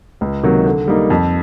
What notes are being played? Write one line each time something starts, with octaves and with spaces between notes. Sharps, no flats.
C#2
C3 D#3 F#3 A#3
D3
G3 A#3 D#4
F2